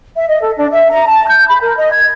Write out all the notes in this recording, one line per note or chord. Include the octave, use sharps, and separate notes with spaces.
E5
D#5
A4
D4
E5
A#5
A5
G6
B5
A#4
D#5
G#6